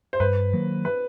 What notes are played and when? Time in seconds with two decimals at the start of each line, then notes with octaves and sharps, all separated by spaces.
0.13 C5
0.20 G2 B4
0.53 D#3 F#3 A#3
0.85 B4